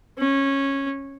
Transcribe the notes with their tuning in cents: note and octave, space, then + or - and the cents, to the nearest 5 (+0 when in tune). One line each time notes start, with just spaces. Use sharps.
C#4 -15